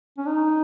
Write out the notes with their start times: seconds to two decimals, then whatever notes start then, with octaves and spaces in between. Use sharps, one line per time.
0.18 C#4
0.26 D#4